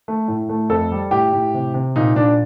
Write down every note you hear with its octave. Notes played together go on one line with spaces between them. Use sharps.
A3
A2
A3
F2 A4
G3
A2 G4
A2
C3
C3
A#2 D#4
A#2 D4